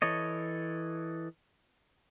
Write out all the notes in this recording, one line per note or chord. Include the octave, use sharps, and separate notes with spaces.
E3 A4 C#5 D#5